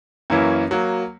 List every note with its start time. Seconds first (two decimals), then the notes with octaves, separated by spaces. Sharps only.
0.30 F#2 E3 A#3 C#4 E4
0.71 F#3 A#3